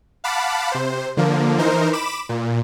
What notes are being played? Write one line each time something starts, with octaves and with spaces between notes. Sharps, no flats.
F5 F#5 A5 B5 D6
C3 C5
D3 F3 A#3
E3 D#4 A#4 C5
B5 D6 E7
A#2